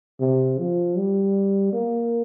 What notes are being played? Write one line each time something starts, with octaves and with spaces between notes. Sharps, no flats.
C3
F3
G3
A#3